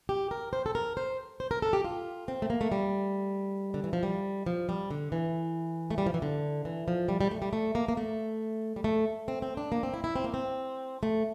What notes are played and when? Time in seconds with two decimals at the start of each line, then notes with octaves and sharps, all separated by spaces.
0.09 G4
0.31 A#4
0.53 C5
0.66 A4
0.75 A#4
0.97 C5
1.40 C5
1.51 A#4
1.62 A4
1.73 G4
1.85 F4
2.28 C4
2.42 A3
2.50 A#3
2.61 A3
2.72 G3
3.74 D3
3.84 E3
3.93 F3
4.03 G3
4.46 F3
4.69 G3
4.91 D3
5.12 E3
5.91 A3
5.98 G3
6.06 F3
6.14 E3
6.22 D3
6.65 E3
6.88 F3
7.09 G3
7.21 G3
7.31 A3
7.42 G3
7.53 A3
7.75 A#3
7.89 A#3
7.97 A3
8.76 G3
8.84 A3
9.28 C4
9.42 C4
9.57 D4
9.72 A#3
9.83 C4
9.94 E4
10.04 E4
10.15 C4
10.24 A#3
10.34 C4
11.03 A3